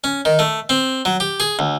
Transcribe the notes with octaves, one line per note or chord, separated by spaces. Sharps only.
C#4
D#3
A3
C4
F#3
G4
G#4
D2